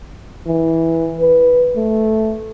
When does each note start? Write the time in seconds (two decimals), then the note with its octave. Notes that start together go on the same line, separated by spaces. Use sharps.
0.47 E3
1.21 B4
1.77 A3